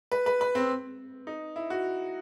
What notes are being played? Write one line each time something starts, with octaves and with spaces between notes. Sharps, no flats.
B4
B4
B4
C4
D#4
E4
F#4